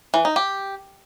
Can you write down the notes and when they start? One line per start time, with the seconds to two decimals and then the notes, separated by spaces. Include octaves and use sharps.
0.14 E3
0.25 D#4
0.36 G4